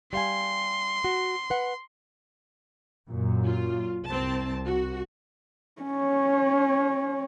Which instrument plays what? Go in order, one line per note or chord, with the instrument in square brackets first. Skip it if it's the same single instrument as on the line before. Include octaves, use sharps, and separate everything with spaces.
[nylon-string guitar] G3 F5 G#5 [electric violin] C6
[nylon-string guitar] F#4
B4 F#5
[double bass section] F#2 A#2
[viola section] F4
[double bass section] C2 [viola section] C4 A5
[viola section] F#4
[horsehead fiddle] C#4 C#5